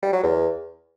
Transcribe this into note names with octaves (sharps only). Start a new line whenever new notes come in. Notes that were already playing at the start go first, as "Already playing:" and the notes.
G3
F#3
E2